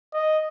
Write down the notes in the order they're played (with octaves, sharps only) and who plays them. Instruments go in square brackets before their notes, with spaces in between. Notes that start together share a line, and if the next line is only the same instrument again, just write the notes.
[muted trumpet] D#5